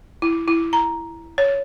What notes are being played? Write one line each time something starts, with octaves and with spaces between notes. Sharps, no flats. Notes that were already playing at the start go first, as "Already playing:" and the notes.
E4
E4
A#5
C#5